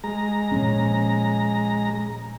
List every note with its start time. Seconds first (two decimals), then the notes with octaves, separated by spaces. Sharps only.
0.04 G#3 A#5
0.52 A#2 F3 C#4